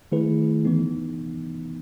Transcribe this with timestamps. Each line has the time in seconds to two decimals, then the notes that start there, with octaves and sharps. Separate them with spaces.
0.12 D#3 A3 E4 G#4 B4
0.65 E3 B3 D#4